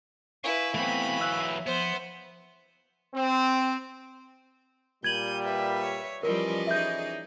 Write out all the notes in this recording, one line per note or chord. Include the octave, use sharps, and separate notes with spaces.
E4 B4 F5 G#5 C#6
E3 F#3 A3 B3 C4 B5
E5 E6 F#6
F3 B3 C5
C4
A#2 G3 G6 G#6 D#7 F#7
B4 E5
C#5
E3 F3 G3 C#4 A#4 D5 D#5
D#4 G#4 E5 G6